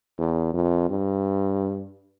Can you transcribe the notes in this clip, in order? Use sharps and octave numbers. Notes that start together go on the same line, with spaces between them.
E2
F2
G2